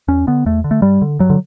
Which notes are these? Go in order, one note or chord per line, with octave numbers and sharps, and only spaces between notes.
E2 C#4
D3 B3
E2 A3
D3
A3
G2 G3
D3
G2 F#3
D3